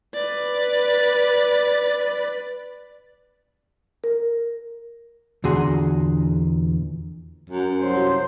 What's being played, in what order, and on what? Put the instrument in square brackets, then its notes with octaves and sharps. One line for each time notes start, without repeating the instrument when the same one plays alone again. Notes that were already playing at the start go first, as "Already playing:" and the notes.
[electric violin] B4 D5
[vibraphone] A#4
[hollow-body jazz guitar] E2 A#2 D3 F#4 G#4 C6
[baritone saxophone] F#2
[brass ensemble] C2 F3 F#3 [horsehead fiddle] C5